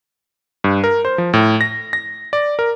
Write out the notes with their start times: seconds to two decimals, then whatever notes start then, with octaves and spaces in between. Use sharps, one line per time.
0.64 G2
0.84 A#4
1.05 C5
1.18 F3
1.33 A2
1.61 A#6
1.93 A#6
2.33 D5
2.59 A#4